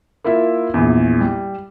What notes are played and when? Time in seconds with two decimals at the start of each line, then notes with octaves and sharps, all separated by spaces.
0.24 A#3 E4 F4 E5
0.74 A#1 E2
1.21 G3